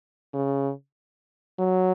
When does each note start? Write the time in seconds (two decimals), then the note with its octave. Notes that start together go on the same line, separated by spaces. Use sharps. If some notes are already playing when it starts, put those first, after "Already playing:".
0.33 C#3
1.59 F#3